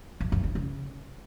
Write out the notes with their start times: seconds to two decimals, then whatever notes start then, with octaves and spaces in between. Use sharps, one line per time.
0.20 F#2
0.32 F#2
0.44 D3
0.55 C#3